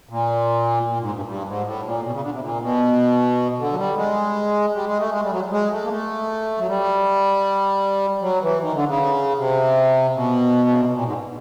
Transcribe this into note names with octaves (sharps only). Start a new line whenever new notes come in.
A#2
A#2
G#2
G2
G2
G#2
A2
A#2
B2
C#3
D3
C3
A#2
B2
D3
F#3
G3
G#3
G3
G#3
A3
G#3
G3
F#3
G#3
A3
A#3
A3
F#3
G3
F#3
E3
D#3
D3
C#3
C3
B2
C#3
C3
B2
A#2
G#2